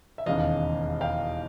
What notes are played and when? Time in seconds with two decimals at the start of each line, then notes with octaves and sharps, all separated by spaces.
0.18 E5
0.26 E1 D#2 C#3 E3 D#5 F5
1.01 F5 G5